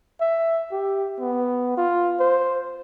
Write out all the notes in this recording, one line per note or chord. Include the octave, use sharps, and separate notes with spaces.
E5
G4
B3
F4
C5